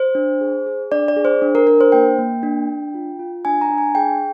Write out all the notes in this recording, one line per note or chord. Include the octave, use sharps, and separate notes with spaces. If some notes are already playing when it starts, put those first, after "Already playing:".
Already playing: C5
D4
G#4
G#4
D4 D5
D5
G#4
C5
D4
A#4
D4 A#4
C5
A#3 G5
A#3
D4
D4
F4
F4
D4 G#5
A#5
D4
G#5
G#4 G5